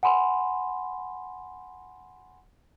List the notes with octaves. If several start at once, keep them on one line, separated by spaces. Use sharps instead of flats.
F#5 G#5 B5 C6